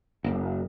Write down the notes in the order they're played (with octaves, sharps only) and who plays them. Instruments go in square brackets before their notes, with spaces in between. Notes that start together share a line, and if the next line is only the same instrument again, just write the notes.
[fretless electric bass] F#1